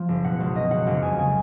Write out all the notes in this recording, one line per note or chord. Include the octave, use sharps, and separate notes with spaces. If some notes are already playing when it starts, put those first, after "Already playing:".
Already playing: F3
F#1
B2 F#5
C#2
B2 D#5
C#2 F#5
F#1 F#5
F2 G#5
C#3 G#5